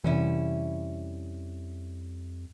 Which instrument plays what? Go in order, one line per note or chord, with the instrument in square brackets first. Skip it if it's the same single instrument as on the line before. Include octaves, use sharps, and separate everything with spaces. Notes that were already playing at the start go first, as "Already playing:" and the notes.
[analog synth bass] F2 [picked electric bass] C3 E3 [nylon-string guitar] G3 C#4 E4